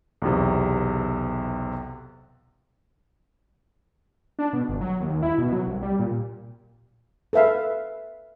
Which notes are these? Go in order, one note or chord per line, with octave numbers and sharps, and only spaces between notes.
B1 E2 C3
D4
B2
G1
F#3
D#2
E4
B2
F#3
C2
G3
A#2
A4 B4 E5 F5